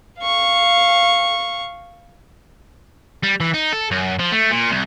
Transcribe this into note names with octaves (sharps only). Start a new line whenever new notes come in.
F5 C#6
G3
E3
D#4
A4
F#2
F3
A3
A#2
C2